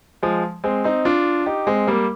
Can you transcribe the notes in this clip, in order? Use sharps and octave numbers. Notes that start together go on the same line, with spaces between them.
F3 G#3
G#3 C4
C4 D#4
D4 F4
D#4 G4
G#3 C4
G3 A#3